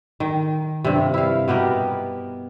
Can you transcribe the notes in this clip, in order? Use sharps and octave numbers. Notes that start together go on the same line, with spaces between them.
D#3
G2 C3
E4 F5
B2 B3 G4 A#4